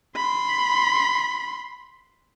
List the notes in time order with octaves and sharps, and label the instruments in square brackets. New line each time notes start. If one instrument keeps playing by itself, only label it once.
[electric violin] B5 C6